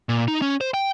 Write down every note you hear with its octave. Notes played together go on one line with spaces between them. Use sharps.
A#2
D#4
C#4
C5
G5